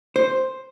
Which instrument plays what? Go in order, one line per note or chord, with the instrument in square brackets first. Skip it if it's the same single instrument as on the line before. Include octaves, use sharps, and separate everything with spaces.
[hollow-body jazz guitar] C5